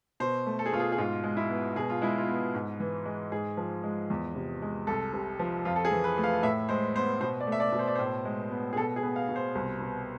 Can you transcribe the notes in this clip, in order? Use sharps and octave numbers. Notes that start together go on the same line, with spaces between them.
B2 C5
A3
A4
G#4
B2 F4
G#4
G#4
G#2 F4
G#3
E4
B3
B2 G#4
F4
G#3 E4
F4
B3
G#2
E3
G#3
G#2 G#4
F3
G#3
E2
C3
G#3
C2 A4
C3
F3
F2 F4
A4
G#4
E3
B4
A3
F5
A2 E5
G#3 C5
B3 C5
B2 C5
D5
A3
E5
D5
B2
C5
D5
A2 C5
G#3
B3
G#4
B2 A4
G#4
B3
F5
B2
C5
C2
B2